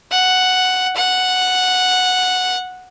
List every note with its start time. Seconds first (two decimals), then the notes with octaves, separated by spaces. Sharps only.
0.12 F#5
0.96 F#5